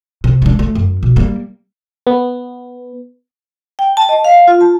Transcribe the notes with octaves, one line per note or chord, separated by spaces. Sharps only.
C3
G#3 D4
A3
F#2
B2
G3 A#3
B3
G5
A5
D#5
F5
F4
A5